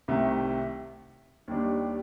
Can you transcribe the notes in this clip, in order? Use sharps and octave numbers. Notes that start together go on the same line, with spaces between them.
C2 C3 D#3 A3
D#2 D#3 G3 D4